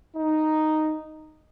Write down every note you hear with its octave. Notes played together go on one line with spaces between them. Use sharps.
D#4